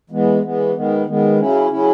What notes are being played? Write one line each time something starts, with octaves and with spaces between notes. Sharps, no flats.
E3 G#3 B3
E3 G#3 B3
D#3 G#3 B3
D#3 G#3 B3
C#3 F#3 C#4 E4
C#3 F#3 C#4 E4